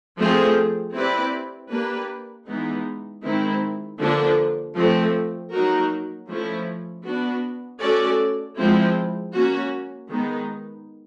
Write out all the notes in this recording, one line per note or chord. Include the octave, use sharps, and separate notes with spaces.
F3 A3 C4 F4 G#4
C4 E4 G4 B4 D5
A#3 D4 G4 B4
E3 G#3 B3 D#4
D#3 G#3 C4 E4
D3 F3 A#3 D4
F3 A3 C4
F#3 A#3 D#4 F#4 A#4
F3 A3 C#4 E4
B3 D4 F#4
A3 C#4 F#4 A4 D5
F3 G#3 C4 E4
A#3 C#4 F#4
D#3 G#3 B3 D#4